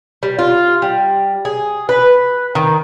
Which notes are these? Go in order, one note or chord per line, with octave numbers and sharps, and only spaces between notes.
G3
F4
G3
G#4
B4
D#3